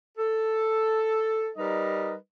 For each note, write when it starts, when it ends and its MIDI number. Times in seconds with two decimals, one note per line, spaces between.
0.17 1.49 69
1.57 2.13 55
1.57 2.13 63
1.57 2.13 70
1.57 2.13 71
1.57 2.13 75